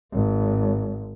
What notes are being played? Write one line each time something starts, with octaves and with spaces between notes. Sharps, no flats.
G#1